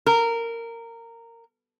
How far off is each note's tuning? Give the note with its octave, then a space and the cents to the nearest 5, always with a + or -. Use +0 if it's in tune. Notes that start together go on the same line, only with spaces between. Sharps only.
A#4 -15